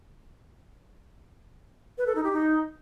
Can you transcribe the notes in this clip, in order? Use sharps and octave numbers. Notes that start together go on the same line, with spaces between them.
B4
A4
D#4
G4
D#4